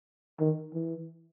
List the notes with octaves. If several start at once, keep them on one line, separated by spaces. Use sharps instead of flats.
D#3
E3